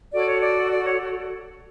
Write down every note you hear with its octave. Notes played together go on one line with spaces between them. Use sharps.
F#4 A4 C#5 D5
C#5
D5
D5
C#5